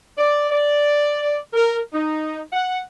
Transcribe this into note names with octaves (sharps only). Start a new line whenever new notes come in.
D5
D5
A#4
D#4
F#5